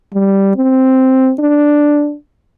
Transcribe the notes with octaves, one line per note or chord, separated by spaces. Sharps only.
G3
C4
D4